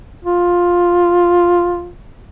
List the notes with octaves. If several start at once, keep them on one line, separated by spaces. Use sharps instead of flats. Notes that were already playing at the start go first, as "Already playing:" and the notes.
F4